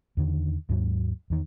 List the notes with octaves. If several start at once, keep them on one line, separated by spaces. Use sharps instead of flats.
E2 D3 D#3
D#2 G#2 F#3
E2 D#3